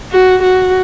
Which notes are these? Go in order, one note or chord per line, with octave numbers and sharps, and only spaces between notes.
F#4
F#4